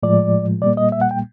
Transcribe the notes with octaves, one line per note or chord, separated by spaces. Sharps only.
A2 F3 G#3 D5
A#2 G3 A#3 D5
D#5
E5
F#5
G5